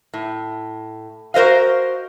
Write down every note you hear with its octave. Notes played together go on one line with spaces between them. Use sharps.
A2
F#4 A#4 C5 D#5 F5